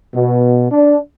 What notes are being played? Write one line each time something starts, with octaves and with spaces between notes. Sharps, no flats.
B2
D4